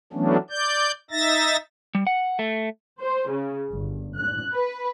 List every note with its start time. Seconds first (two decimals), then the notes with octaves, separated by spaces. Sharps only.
0.13 E3 F#3 A3 B3 C#4 D4
0.50 D5 G6
1.11 D#4 E5 A6 A#6
1.95 G3
2.07 F#5
2.39 A3
3.00 C5
3.29 C#3
3.72 G1
4.14 F#6
4.54 B4